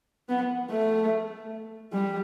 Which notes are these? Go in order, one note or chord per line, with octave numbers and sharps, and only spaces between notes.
B3
A3
G3